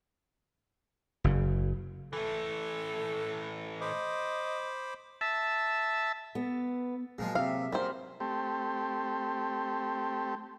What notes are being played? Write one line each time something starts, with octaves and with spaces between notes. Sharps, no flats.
F#1 C#3
E3 A3 A4
C5 D#5 B5 D6
E5 A5
B3
A#2 F3 F#3 G#3 A#3 G#4
C3 G4 E5 F5
F#2 G3 A#4 C5
A3 C4 G4